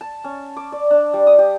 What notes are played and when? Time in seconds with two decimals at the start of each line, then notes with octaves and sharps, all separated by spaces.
0.01 A5
0.24 C#4
0.57 D6
0.72 D5
0.91 D4
1.14 G3
1.27 D#6
1.39 G4